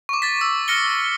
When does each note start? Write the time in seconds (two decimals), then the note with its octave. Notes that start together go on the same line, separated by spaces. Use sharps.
0.09 C#6 D6
0.22 A6 B6
0.41 E6
0.68 F6 A#6 C#7 G7